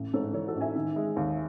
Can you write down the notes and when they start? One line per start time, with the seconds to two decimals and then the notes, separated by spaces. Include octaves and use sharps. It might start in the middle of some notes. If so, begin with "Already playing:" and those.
Already playing: A1
0.13 G#2 A4 C#5
0.33 E3 A4 C#5
0.47 F#4 A4
0.55 A1
0.61 E5 G#5
0.76 D#3
0.96 G#3
1.16 D#2